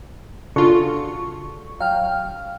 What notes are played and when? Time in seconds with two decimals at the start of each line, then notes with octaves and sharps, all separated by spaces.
0.56 C#3 D4 F4 F#4 A4 C#6
1.80 F#3 F5 G5 F6